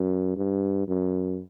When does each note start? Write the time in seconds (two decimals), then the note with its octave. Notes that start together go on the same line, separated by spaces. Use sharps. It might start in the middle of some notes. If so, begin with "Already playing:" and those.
Already playing: F#2
0.37 G2
0.88 F#2